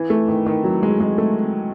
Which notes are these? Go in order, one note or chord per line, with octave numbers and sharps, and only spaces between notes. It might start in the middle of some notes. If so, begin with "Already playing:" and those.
Already playing: E3
A3
D#3
D#3
F#3
G#3
G#3
A3